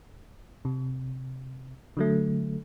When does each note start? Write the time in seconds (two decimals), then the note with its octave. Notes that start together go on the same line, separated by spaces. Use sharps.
0.65 C3
1.97 D3 F#3 A3